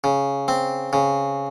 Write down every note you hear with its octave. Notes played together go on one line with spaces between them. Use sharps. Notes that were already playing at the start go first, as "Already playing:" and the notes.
C#3
C4
C#3